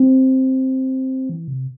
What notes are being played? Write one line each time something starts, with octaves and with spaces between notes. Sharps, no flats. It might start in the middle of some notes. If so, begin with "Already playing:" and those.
Already playing: C4
E3
C3